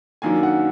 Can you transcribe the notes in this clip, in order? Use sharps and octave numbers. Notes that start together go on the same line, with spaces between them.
F#2 D#3 A#3 D4 G#5
F#5